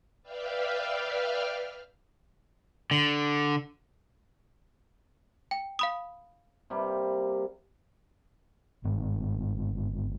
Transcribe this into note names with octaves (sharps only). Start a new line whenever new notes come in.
B4 D5 E5 F5 G5 F6
D3
G5
F5 B5 D#6
C3 G3 A#3
G1 G#2